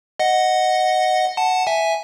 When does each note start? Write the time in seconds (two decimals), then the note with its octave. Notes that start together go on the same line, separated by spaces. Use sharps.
0.19 D#5 F#5
1.37 F#5 A5
1.67 E5 G#5